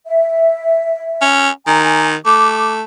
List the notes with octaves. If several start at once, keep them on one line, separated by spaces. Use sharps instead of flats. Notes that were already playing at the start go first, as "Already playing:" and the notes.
E5
C#4
D#3 G#5 A#5
A3 D6